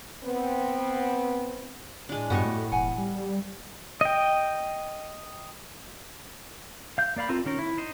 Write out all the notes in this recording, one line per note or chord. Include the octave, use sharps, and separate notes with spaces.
B3 C4
A2 G#3 D4
G2 B3 F#4 G4 D#5 C#6
A3
E1 F#5 G#5
G3
D#5 G5
F5 G6
A#3 D5 F5 B5
C4 F4 A4 A#4
D#3 C#4 A#4
E4
D#4 C5 D#5